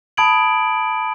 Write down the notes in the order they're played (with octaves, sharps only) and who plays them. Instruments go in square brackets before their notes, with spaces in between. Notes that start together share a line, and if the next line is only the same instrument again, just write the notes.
[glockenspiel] A5 B5 D#6 G#6 D7 F#7